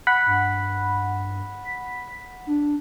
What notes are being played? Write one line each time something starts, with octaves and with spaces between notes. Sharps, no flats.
F#5 B5
G2
B6
D4